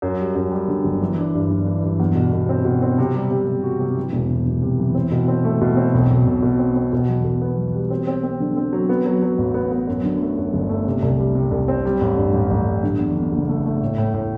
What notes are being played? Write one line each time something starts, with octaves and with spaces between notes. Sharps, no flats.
F#2
G3
F#2
G3
D3
G1
E3
D4
G2
E3
E3
G2
E2
B2
B2
C4
B2
C4
C3
G3
C3
C3
F#4
C3
E3
E1
E1
E1
C3
E3
C4
B2
C4
A3
B2
C4
B1
B1
B1
B2
C4
C4
B2
E2
B2
B3
E2
G3
C4
C4
C4
D3
C4
F#3
B3
F#3
F#3
A1
B3
B3
F#2
D3
A3
F#2
G1
A3
C3
C2
G3
C3
C2
C4
G3
A1
G2
A1
A1
G3
D3
E2
D3
F#1
A3
A3
A2
A2
A2